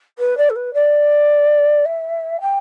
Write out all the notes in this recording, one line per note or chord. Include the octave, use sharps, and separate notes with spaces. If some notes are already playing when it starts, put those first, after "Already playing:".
B4
D5
A4
B4
D5
E5
G5